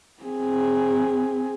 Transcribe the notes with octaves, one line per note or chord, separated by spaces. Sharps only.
C4 G#4